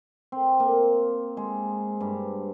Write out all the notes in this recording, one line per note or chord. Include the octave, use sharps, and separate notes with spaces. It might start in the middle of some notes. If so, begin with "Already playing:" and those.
C4
A#3
G#3
G2